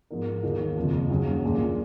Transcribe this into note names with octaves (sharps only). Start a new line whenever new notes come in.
G#2 F3 B3 D#4 A#4
D#2 D#3 A#3 D#4 G#4
F#1 F2 F3
D#2 C#3 F#3 C#4 G#4
A#1 A#2 G#3